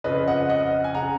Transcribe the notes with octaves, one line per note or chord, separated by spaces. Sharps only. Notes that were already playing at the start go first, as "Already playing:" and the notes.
F2 C#3 B4 D#5
D#5 F#5
D#5 F#5
G#5
C#3 F#5 A#5